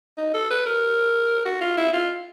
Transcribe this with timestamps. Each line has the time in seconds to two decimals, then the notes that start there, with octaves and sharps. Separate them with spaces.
0.18 D#4
0.34 A4
0.50 B4
0.66 A#4
1.45 F#4
1.61 F4
1.77 E4
1.93 F4